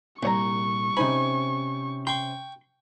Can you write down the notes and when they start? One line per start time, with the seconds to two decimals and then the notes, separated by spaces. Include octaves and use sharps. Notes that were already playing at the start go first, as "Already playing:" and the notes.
0.23 C2 A#2 C#5 A#5 C#6
0.97 C3 C#4 D#4 C5 G#5 B5
2.07 G5 C6 C#6